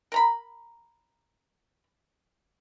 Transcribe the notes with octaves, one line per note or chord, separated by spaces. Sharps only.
A#4 A#5 B5